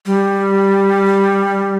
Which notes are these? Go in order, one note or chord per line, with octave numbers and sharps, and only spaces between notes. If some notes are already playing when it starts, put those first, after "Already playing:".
G3